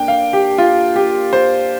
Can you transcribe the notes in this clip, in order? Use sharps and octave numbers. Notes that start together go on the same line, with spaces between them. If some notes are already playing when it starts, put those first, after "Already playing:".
Already playing: A#3 D4 G5
F5
G4
F4
G4
C5